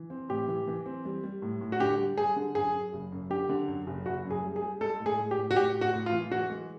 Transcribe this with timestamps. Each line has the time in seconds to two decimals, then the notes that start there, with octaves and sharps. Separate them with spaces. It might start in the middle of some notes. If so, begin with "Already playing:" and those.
Already playing: E3
0.10 C4
0.29 A2 G4
0.48 E3
0.67 E3
0.86 C4
1.05 G3
1.23 G3
1.42 A2
1.61 A2
1.72 F#4
1.80 D3 G4
1.98 G3
2.17 G3 G#4
2.36 D3
2.55 F#2 G#4
2.73 F#2
2.93 F#1
3.12 F#2
3.30 D3 G4
3.49 D3
3.68 F#2
3.87 F#1
4.06 F#1 F#4
4.25 F#2
4.31 G#4
4.43 G3
4.56 G#4
4.62 G3
4.81 G#3 A4
5.00 A2
5.06 G#4
5.18 A2
5.31 G4
5.37 A2
5.51 F#4
5.56 A2 G4
5.75 A2
5.81 F#4
5.94 A2
6.06 F4
6.12 E3
6.31 E3 F#4
6.50 G#3